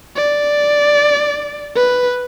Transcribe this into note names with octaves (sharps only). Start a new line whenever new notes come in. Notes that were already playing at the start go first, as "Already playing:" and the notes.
D5
B4